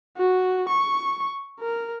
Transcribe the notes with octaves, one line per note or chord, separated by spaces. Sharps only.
F#4
C#6
A#4